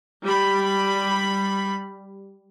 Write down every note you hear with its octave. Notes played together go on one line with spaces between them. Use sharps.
G3 B5